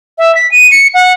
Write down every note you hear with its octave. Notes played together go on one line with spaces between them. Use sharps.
E5
B6
D#7
C#7
F#5